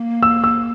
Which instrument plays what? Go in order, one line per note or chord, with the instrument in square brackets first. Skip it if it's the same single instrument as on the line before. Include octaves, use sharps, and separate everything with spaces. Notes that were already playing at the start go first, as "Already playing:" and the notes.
Already playing: [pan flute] A#3
[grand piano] E6
E6